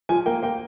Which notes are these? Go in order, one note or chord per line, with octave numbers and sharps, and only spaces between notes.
F3 G#5
A#3 G5
A#3 G5